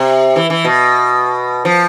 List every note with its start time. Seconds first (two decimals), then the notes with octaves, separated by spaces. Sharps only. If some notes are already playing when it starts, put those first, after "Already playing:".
Already playing: C3
0.36 E3
0.50 E3
0.65 B2
1.65 F3